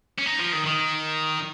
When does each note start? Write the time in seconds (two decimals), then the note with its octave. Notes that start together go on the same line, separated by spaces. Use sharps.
0.19 C#4
0.26 D#4
0.39 F3
0.53 D#3
0.66 D#3